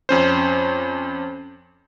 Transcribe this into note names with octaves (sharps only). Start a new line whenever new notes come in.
F2 C#4 C5